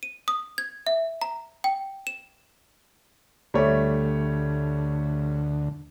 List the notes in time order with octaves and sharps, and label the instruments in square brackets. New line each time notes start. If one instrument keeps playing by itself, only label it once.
[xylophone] D#7
D#6
G#6
E5
A#5
G5
E7
[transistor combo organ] D2 [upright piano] G3 A3 C#5